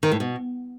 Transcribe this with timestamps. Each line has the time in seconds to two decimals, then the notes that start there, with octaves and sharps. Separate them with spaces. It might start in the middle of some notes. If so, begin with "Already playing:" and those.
0.03 D#3
0.11 A2
0.20 B2